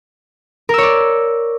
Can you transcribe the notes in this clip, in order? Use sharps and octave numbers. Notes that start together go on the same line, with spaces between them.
A#4 C#5 D5 E6